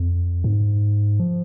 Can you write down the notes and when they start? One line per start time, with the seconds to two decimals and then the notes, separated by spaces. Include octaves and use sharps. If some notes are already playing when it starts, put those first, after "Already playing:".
Already playing: F2
0.44 G#2
1.20 F3